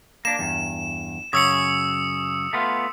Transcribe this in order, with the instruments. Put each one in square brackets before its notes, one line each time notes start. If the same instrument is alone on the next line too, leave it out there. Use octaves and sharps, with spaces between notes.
[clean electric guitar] A#3 D4 [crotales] E7
[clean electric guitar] E2 G2
[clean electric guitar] F#2 C#3 C#5 [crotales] D#6 E6 C#7
[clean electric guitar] A3 B3 F4